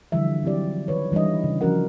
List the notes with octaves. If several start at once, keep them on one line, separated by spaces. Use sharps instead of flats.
D3 E3 F3 G3 E5
F#3 C4 E4 G4 D5
D#3 B4 C#5
E3 G3 D4 E4 D#5
C#3
F3 C#4 F#4 A#4 F#5